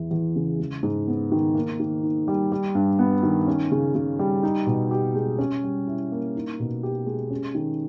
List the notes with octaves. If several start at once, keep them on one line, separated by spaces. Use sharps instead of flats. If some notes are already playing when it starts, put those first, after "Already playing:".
Already playing: E2 E3
E2
C#3
G#3
G#2
B3
D#3
A#3
D#3
D#4
G3
G3
G2
B3
D#3
C#4
C#3
C#3
G3
D#4
B2
G4
G#3
C#4
G3
E4
A#3
D#4
B2
G4
G#3
C#4
D#3